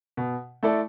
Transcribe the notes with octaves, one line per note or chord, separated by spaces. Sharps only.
B2
A3 E4 A4 D5